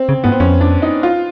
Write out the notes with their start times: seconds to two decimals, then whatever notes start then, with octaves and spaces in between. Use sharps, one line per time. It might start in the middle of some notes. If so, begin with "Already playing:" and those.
Already playing: C4
0.09 C#3
0.24 G#2 B3
0.32 C4
0.40 F2 C#4
0.61 D4
0.82 D#4
1.03 F4